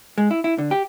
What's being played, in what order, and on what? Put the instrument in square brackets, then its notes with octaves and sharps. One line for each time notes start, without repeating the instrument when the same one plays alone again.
[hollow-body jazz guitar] G#3
E4
E4
D3
G4